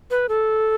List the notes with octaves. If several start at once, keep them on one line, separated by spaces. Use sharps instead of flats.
B4
A4